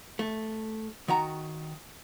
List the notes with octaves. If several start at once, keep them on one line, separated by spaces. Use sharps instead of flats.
A3
D#3 F#4 A#5